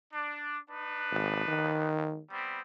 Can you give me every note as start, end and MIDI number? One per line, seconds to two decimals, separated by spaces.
0.13 0.57 62
0.71 1.89 62
0.71 1.89 63
0.71 1.89 71
1.11 1.44 32
1.48 2.21 51
2.30 2.61 55
2.30 2.61 59
2.30 2.61 60